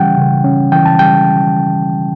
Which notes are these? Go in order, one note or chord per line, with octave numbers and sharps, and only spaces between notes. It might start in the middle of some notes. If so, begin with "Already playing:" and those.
Already playing: C#3 E3 G3 C#4 F#5 G5
C#3
C#4
E3 G5
A5
G3 G5